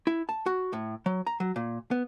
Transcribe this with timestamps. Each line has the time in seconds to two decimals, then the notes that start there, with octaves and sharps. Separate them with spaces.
0.07 E4
0.29 A5
0.46 F#4
0.73 A2
1.06 F#3
1.27 A#5
1.40 F#3
1.56 A#2
1.91 B3